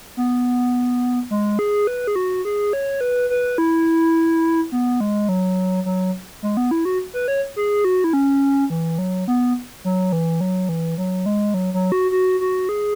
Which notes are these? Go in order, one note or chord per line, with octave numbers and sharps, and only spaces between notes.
B3
G#3
G#4
B4
G#4
F#4
G#4
C#5
B4
B4
E4
B3
G#3
F#3
F#3
G#3
B3
E4
F#4
B4
C#5
G#4
F#4
E4
C#4
E3
F#3
B3
F#3
E3
F#3
E3
F#3
G#3
F#3
F#3
F#4
F#4
F#4
G#4